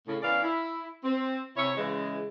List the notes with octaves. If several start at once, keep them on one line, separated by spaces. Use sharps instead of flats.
A2 C#3
E3 B3 C#4 A#4 D5 F5
E4
C4
C3 E4 C#5
C#3 E3 G#3